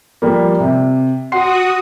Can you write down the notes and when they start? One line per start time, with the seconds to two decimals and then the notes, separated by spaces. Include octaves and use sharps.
0.22 F3 G3 A#3
0.60 C3
1.32 F#4 F#5 C6 D#6 C7